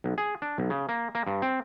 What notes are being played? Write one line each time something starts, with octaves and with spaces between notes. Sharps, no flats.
B1
G#4
D4
B1
C#3
A#3
A#3
G2
C4